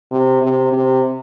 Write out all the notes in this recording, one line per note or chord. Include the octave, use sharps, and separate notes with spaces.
C3
C3
C3